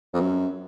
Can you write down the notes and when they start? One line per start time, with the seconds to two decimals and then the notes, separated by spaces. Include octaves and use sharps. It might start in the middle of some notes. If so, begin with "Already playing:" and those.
0.14 F2
0.20 F#2